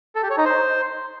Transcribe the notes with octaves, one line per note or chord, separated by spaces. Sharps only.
A4
G4
C#5
D#4
C5